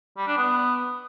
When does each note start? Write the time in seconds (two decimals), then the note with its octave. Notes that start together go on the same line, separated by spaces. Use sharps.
0.17 G3
0.27 D4
0.37 B3